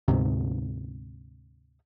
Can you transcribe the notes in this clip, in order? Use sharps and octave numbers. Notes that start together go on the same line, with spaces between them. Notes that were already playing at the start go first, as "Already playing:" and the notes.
D2 G#2 C3